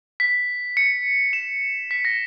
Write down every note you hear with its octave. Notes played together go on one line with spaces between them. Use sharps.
B6
C#7
E7
B6
A#6